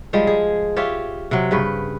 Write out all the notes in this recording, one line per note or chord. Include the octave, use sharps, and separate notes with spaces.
F3 G3 G#3
G#4
F4 G4 C#5 E5
C3 F#3
G2 C#3 B4